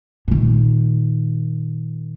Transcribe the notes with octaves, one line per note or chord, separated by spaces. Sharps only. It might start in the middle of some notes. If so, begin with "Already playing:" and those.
A#2 D#3